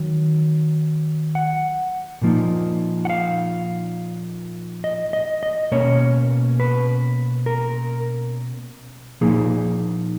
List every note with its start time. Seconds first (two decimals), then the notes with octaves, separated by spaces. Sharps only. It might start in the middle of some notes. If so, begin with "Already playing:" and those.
Already playing: D#3 F#3
1.35 F#5
2.22 A#2 F3 A#3 D#4
3.05 F#5
3.10 F5
4.84 D#5
5.13 D#5
5.43 D#5
5.72 B2 A#3 C#4 C#5
6.60 B4
7.46 A#4
9.21 A#2 F3 A#3 D#4 G#4